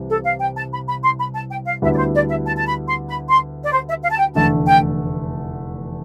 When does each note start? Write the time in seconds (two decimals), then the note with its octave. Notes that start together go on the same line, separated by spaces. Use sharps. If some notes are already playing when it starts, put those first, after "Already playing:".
Already playing: C2 C3 E3
0.09 A4
0.24 F5
0.40 G5
0.55 A5
0.72 B5
0.87 B5
1.03 C6
1.19 B5
1.35 A5
1.50 G5
1.67 F5
1.82 D2 D3 G3 B3 E4 E5
1.93 D5
1.97 C5
2.14 D5
2.29 E5
2.45 A5
2.57 A5
2.66 B5
2.87 C6
3.08 B5
3.30 C6
3.64 D5
3.71 C5
3.88 E5
4.02 F5
4.11 A5
4.18 G5
4.35 F1 E2 D3 A3 D4 A5
4.66 G5